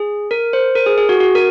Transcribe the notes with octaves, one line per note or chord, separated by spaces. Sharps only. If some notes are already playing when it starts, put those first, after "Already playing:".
Already playing: G#4
A#4
C5
A#4
G#4
G#4
F#4
F#4
A#4